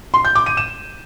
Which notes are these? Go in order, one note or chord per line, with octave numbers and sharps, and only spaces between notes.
C6
G6
D6
D#7
E7